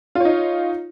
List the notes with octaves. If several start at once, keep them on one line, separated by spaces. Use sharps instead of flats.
D#4 F4 C#5